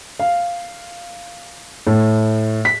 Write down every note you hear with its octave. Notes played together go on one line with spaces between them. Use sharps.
F5
A2
B6